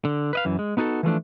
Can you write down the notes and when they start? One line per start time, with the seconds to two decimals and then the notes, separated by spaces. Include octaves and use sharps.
0.05 D3
0.33 B4 D#5 F5
0.45 F#2 E3
0.59 G#3
0.77 B3 D#4 F#4 G#4 A4
1.03 E3 F3 A3 D4